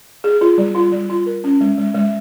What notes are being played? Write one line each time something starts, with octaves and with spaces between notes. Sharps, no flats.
G#4
F4
G3
F4
G3
F4
A#4
C#4
G#3
G#3
G#3